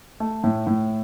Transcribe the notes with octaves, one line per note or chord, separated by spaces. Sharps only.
A3
A2
A2